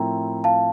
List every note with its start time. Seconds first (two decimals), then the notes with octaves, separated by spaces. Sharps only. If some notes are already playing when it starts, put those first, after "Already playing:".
Already playing: A2 F3 C4 E4 A#4 G5 A#5
0.44 F5 A5